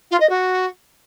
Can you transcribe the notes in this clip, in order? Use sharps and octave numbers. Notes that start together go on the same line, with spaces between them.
F4
D#5
F#4